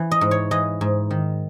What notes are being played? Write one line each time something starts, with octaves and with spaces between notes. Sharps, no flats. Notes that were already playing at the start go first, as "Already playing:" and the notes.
Already playing: E3
D#5
G#2
C#5
E3 D#5
G#2
D#3